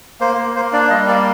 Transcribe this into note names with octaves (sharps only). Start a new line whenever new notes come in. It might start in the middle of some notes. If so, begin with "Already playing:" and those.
A#3 C5
A#3
A#3 C5
D4 D5
G3 D#5
A#3 D5